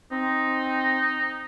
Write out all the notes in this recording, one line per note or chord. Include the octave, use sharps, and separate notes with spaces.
C4 D#4